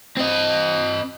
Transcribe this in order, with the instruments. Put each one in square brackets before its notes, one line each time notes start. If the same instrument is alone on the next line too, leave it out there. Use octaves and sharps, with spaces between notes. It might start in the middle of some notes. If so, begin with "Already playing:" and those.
[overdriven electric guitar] C4 D#5